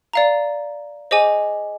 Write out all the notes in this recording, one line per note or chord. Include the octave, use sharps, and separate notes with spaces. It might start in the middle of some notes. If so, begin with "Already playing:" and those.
D5 F5 A#5
G#4 C5 D#5 G#5 D6